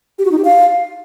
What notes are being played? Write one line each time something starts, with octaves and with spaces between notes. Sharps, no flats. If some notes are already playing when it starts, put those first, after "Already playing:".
G4
F#4
D#4
G4
F5